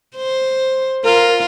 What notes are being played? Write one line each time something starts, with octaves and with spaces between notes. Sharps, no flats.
C5
F4 A#4